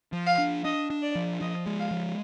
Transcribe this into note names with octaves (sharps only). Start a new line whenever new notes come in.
F3
F5
D4
D4 D#5
D4
D5
F3
F3 D#5
G#3
F5
F3